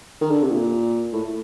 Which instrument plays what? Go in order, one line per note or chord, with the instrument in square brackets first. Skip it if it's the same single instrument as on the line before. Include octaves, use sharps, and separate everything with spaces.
[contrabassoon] D#3
D3
C3
A#2
A2